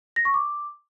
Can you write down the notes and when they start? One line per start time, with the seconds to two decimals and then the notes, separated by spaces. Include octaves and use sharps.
0.16 A#6
0.25 C#6
0.34 D6